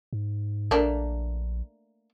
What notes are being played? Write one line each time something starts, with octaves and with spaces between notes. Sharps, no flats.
G#2
A#1 A3 A#3 D4